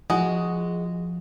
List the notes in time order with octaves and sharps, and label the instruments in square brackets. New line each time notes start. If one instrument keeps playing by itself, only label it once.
[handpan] F3 [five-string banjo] G#3 F#4